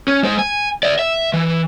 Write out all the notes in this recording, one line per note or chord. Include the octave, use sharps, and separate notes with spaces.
C#4
G#3 C5
G#5
D5 E5
E5
E3